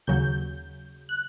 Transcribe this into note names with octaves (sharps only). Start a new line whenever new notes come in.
D#2 C#3 F#3 G6
F#6